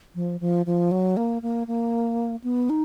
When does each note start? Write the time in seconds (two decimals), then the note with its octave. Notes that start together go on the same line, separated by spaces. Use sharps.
0.15 F3
0.41 F3
0.66 F3
0.91 F#3
1.17 A#3
1.42 A#3
1.67 A#3
2.44 B3
2.70 D#4